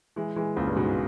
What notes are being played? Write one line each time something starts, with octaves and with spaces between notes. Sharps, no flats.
E3 G#3
E3 G#3
C#2 A#2
G2
G#2 B2